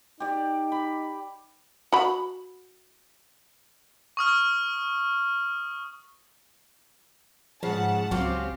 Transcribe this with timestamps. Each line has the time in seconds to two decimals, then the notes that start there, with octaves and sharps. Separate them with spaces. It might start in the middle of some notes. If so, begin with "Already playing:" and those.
0.20 D#4 G4 D5
0.72 B5
1.93 F#4 B5
4.17 C#6 D#6 F6
7.63 G#2 C#3 F3 F#5 A5
8.11 C#2 F#3 C4 C#4 F4 G4